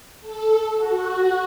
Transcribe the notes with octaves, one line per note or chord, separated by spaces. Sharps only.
A4
F#4